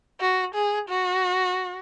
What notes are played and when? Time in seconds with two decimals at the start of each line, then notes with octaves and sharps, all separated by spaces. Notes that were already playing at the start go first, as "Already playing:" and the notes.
0.20 F#4
0.55 G#4
0.89 F#4